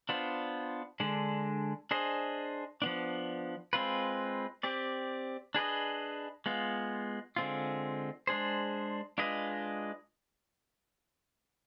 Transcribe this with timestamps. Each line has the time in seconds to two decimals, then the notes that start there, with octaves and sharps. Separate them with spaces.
0.09 B3 D4 F4 C5
1.00 D3 G#3 D4
1.91 D4 G#4 C5 D#5
2.82 F3 B3 D4
3.73 G#3 C4 F4 B4
4.63 C4 G4 D5
5.55 D4 G#4 B4 D#5
6.46 G#3 B3 F4
7.36 D3 G#3 C4 F4
8.27 G#3 D4 G#4 C5
9.18 G#3 D4 F4 B4 D#5